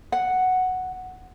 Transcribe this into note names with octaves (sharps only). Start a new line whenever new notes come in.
F#5